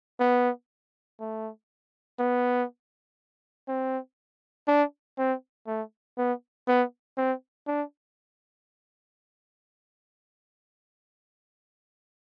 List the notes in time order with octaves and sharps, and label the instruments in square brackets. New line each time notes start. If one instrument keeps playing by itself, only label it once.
[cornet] B3
A3
B3
C4
D4
C4
A3
B3
B3
C4
D4